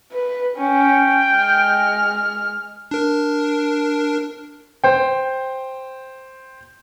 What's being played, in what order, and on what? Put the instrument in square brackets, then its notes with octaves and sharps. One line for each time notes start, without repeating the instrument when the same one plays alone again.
[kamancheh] B4
[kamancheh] C#4 [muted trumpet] G5
[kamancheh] G#3 F6
[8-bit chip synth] D4 A#4
[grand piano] C5 G5